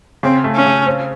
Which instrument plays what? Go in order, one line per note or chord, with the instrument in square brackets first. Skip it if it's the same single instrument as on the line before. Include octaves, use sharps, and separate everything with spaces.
[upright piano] C#3 [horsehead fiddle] C4
[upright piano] A3
[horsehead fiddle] C#4
[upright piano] C#3
C4